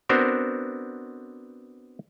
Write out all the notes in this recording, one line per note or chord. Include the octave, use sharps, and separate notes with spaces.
B3 C4 D4 F#4 A#4 C5